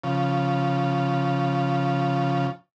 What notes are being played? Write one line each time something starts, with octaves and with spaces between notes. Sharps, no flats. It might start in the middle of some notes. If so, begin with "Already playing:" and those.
C#3 F3